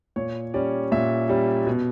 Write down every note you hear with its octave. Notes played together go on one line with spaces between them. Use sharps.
A#2 C#5
G3 C#4 D5
A#2 E5
G3 C#4
B2